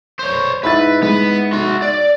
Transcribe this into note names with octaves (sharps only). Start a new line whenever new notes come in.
C5 C#5
G#2 E4 B4 A6
G#3 B3
F#4 C6
D5